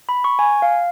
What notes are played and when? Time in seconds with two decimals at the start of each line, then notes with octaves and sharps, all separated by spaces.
0.09 B5
0.24 C#6
0.39 G#5
0.62 F5